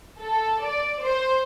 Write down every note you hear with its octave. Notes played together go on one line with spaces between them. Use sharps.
A4
D5
C5